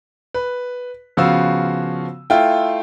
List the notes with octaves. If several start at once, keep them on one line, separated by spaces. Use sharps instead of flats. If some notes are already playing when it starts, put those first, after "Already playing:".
B4
C#3 F3 B3 F#4 F5 E6
A3 E4 F4 G5